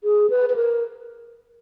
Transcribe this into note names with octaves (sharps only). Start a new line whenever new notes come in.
G#4
B4
B4
A#4